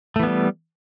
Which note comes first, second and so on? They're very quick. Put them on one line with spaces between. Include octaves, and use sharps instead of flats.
A3 E3 B3 G3